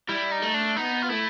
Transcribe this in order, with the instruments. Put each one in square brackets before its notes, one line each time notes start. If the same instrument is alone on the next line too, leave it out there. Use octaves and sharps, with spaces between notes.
[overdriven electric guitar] G3 [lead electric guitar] E4
[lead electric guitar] D#4
[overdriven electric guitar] A3
[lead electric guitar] D4
[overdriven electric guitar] B3 [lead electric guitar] D#4
[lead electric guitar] F4
[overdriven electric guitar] A3 [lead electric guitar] E4